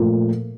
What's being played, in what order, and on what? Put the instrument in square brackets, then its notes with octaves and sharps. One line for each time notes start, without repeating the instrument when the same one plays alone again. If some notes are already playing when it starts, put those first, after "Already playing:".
Already playing: [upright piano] A#2 F3 A3